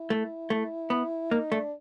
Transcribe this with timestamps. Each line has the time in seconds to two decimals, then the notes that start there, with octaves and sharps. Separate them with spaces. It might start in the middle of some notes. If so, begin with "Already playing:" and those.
Already playing: E4
0.10 A3
0.50 A3
0.90 B3
1.31 A#3 D#4
1.52 A3 D4